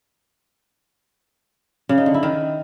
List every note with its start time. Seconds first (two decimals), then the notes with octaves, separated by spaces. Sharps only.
1.89 C#3
1.98 D#4
2.06 D3
2.14 E4
2.23 D#3